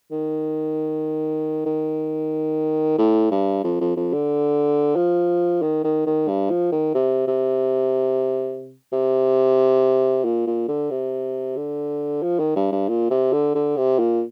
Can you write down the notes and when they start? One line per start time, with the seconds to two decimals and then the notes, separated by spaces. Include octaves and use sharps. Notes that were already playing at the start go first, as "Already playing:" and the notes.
0.12 D#3
1.66 D#3
2.98 A2
3.31 G2
3.64 F2
3.81 F2
3.97 F2
4.13 D3
4.96 F3
5.62 D#3
5.84 D#3
6.07 D#3
6.28 G2
6.50 F3
6.72 D#3
6.95 C3
7.28 C3
8.93 C3
10.25 A#2
10.47 A#2
10.69 D3
10.91 C3
11.57 D3
12.23 F3
12.39 D#3
12.56 G2
12.72 G2
12.89 A#2
13.11 C3
13.33 D3
13.55 D3
13.77 C3
13.99 A#2